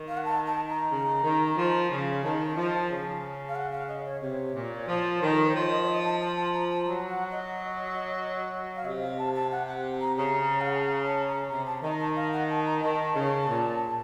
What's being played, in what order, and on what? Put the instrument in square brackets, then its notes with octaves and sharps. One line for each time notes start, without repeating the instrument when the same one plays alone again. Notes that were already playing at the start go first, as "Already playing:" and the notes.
Already playing: [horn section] D#3
[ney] F5
F#5
A5
A5
A#5
[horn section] C#3
D#3
F3
C#3
[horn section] D#3 [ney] A5
[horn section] F3
C#3
[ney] F5
F#5
F5
D#5
C#5
[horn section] C3 [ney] C#5
[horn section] A#2
F3
D#3
[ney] A4
A#4
C5
[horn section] F3 [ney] C#5
[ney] D#5
C#5
D#5
A5
A5
A5
A#5
A5
[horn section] F#3 [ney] A#5
[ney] F#5
D#5
F5
[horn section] C3 [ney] D#5
[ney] F5
A5
A5
F#5
F#5
A#5
[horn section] C#3 [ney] A#5
[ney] F5
F#5
A5
A#5
A5
A#5
[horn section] C3 [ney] A#5
[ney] A5
[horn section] D#3 [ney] A#5
[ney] A5
F5
F#5
A5
A#5
[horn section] D#3 [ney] A5
[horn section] C#3
A#2